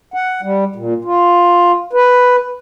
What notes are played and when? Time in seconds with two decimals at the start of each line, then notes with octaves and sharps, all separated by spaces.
0.14 F#5
0.42 G3
0.76 A#2
1.05 F4
1.93 B4